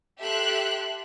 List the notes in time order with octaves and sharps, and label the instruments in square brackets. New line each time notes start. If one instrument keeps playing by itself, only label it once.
[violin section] G4 A4 E5 C6 F#6